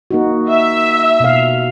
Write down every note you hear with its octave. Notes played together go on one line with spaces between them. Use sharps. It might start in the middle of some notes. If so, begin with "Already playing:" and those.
A#3 D#4 F#4
E5
B2 F5